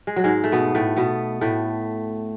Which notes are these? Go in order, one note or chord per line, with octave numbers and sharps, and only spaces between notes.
G#3
F#3
G#2 G#3
A3
B2 B3
A2 A3
B2 B3
A2 A3